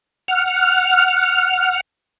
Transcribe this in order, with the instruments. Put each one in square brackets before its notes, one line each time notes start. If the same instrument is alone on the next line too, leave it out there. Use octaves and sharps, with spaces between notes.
[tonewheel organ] F#5 F6